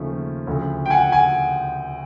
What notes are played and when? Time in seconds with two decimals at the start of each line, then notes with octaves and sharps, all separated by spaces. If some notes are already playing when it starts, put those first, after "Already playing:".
Already playing: D#2 C#3 F3 A3
0.47 D2 C#3 F3
0.86 G5
0.90 F#5 G#5
1.12 F#5 G#5